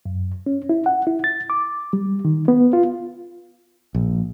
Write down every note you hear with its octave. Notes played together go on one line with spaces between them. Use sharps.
F#2
C#4
E4
F#5
E4
A6
D6
G3
D#3
B3
F4
A#1